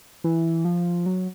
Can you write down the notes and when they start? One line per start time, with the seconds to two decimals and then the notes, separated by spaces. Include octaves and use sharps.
0.24 E3
0.65 F3
1.06 F#3